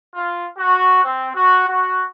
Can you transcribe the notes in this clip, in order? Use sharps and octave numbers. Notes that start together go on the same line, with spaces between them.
F4
F#4
C4
F#4
F#4